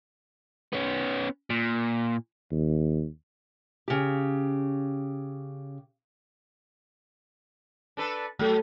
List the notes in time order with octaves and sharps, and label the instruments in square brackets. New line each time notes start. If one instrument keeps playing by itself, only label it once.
[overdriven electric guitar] B3 C#4
A#2
[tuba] D#2
[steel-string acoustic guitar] C#3 G4
[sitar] D4 A4 B4
[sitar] F#3 [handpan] A3 A4